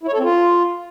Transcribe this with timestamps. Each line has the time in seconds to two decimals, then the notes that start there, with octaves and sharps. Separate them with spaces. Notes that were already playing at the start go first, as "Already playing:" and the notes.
0.03 E4
0.08 C#5
0.13 A4
0.18 C4
0.23 F4